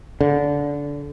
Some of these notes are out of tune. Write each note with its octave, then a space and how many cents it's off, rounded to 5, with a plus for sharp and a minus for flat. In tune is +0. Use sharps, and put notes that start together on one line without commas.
D3 -20